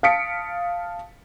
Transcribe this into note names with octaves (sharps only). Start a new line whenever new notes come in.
F5 A5 D#6 B6 C#7 D7